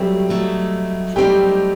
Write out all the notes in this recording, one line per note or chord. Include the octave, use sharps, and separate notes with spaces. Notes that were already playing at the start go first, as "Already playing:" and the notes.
Already playing: F#3 G3 A3 C4 G4
F#3 A3 C4 D#4
F#3 G3 A3 C4 D#4 G4